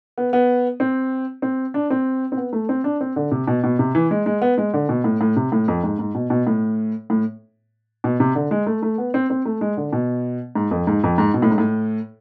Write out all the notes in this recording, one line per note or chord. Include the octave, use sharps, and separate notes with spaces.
B3
B3
C4
C4
D4
C4
C4
B3
A3
C4
D4
C4
D3
C3
B2
B2
C3
E3
G#3
G#3
B3
G#3
D3
B2
A2
A2
C3
A2
F2
G#2
G#2
B2
B2
A2
A2
B2
C3
D3
G#3
A3
A3
B3
C4
C4
A3
G#3
D3
B2
G#2
F2
G#2
F2
G#2
B2
A2
G#2
A2